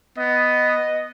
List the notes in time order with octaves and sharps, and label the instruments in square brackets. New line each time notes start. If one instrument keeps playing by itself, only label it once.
[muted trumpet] B3 [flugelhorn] D#5